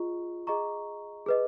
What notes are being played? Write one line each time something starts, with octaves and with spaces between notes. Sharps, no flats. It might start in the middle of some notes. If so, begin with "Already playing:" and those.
Already playing: F4 G#4 D#5 A#5 C#6
G#4 D#5 A#5 C#6
G#4 B4 D#5